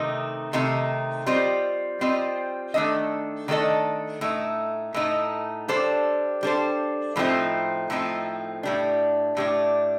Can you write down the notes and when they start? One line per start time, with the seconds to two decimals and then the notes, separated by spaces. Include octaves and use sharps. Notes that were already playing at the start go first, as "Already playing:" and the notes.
Already playing: C3 D#3 A3 D#4
0.53 C3 D#3 A3 D#4
1.26 G3 C4 F4 C5 D#5
2.01 G3 C4 F4 C5 D#5
2.74 D#3 A3 D4 A4 D#5
3.48 D#3 A3 D4 A4 D#5
4.21 A2 A3 D#4
4.94 A2 A3 D#4
5.68 G3 D4 A4 C5
6.43 G3 D4 A4 C5
7.16 A2 F3 A3 C4 D#4
7.90 A2 F3 A3 C4 D#4
8.63 A2 G3 D4
9.37 A2 G3 D4